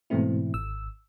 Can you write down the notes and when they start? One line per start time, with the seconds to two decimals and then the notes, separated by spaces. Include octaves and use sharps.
0.10 G#2 B2 E3 A3 C4 E4
0.53 G#1 E6